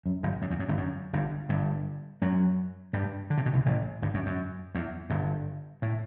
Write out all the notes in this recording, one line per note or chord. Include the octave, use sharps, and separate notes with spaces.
F#2
G1 G2
F#2
E2
F#2
G1 G2
F#2
G1 G2
G1 G2
F#2 F#3
G2 G3
D3
C3
B2
C2 C3
A1 A2
G1 G2
F#2
F#2
E2
G1 G2
A2